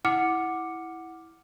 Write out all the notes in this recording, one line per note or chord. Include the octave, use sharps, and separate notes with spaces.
E4 F#5 D6 F6 C#7